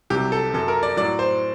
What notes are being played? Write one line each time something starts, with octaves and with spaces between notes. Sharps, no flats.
C2 C3 F#3 G4
A4
F#2 F#3 A4
A#4
D5
A2 F#3 D5
C5